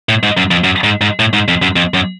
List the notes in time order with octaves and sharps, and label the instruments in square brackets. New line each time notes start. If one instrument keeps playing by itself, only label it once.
[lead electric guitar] A2
G#2
F#2
F2
F#2
G#2
G#2
A2
G#2
F2
F#2
F2
F#2